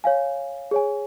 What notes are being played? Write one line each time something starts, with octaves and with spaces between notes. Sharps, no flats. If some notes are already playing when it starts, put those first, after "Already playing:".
C#5 F5 G#5
G#4 C#5 G#5